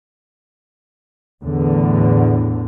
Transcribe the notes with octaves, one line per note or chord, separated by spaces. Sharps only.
E2 A2 D3